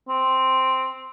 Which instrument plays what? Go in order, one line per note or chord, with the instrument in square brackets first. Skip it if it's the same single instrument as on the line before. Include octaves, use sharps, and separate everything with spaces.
[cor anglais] C4